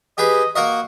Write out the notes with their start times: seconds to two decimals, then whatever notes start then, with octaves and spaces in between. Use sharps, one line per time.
0.18 G4 G#4 B4 D#5
0.56 A#3 F#4 A#4 D#5